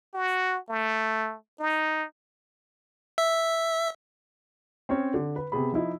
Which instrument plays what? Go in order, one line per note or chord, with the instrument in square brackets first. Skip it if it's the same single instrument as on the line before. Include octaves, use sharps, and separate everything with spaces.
[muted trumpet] F#4
A3
D#4
[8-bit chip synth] E5
[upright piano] C4 C#4 C#5
D3
B4
C3 B3 G#4 B5
F3 D#4 E4